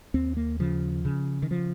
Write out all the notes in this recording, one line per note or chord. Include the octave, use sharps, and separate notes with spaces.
D#2 C4
A#3
C#3 F3
C#3
D#3
F3